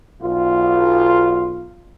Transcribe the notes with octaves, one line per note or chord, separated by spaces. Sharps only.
B1 F4